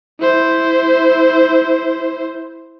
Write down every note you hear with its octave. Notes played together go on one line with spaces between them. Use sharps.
E4 C5